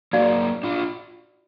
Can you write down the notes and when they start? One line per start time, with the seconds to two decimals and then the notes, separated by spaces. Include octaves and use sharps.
0.13 F#3 A#3 D#4 F#4 D5 F5
0.63 D4 F4